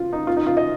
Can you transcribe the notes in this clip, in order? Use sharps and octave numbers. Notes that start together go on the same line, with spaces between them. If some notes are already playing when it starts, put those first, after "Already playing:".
Already playing: F4
D#4
F4
D#4
F4
D#5